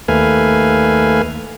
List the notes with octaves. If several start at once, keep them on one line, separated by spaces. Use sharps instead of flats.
D#2 A3 B4 F5 G#5